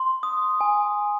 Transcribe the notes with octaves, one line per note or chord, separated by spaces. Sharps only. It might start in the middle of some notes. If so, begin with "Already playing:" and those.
Already playing: C6
D#6
G#5